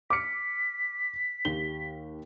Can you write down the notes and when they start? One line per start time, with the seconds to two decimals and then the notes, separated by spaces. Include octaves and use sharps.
0.10 D6 F6 B6 C#7
1.45 D#2 G4 G7